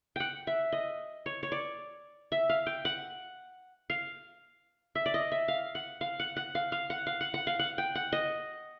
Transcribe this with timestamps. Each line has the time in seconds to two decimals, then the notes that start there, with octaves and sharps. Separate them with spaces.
0.16 F#5 G5
0.47 E5
0.72 D#5
1.26 C#5
1.43 C#5
1.52 D5
2.32 E5
2.49 F5
2.67 G5
2.85 F#5
3.90 F5
4.95 E5
5.06 D5
5.14 D#5
5.32 E5
5.48 F5
5.75 F#5
6.01 F5
6.20 F#5
6.36 F#5
6.55 F5
6.72 F5
6.90 F#5
7.07 F5
7.21 F#5
7.34 F#5
7.47 F5
7.59 F#5
7.78 G5
7.95 F#5
8.12 D#5